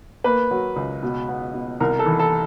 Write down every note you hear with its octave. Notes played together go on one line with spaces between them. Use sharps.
A#3 B4
F#3
C#2
B2
B3
B2
C2 A#4
A4
E3
A4